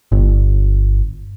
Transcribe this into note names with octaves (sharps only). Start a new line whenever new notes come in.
G1